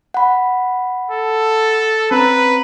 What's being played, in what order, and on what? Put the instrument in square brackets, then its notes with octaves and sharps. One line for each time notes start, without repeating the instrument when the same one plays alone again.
[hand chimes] F#5 B5
[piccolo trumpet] A4
[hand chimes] C4 C#4 A#5 [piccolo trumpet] B4